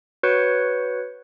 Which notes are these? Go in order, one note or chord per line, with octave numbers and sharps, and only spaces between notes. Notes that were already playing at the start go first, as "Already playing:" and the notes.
F#4 B4 C#5 G6 C#7